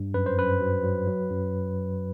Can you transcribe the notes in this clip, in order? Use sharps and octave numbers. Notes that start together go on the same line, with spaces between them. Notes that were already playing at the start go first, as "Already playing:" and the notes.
Already playing: G2
F#2 B4
C5
F#2 B4
F#3
F#3
F#3
F#2